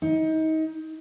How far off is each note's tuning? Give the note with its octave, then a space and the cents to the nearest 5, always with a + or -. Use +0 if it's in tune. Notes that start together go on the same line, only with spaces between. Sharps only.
D#4 +30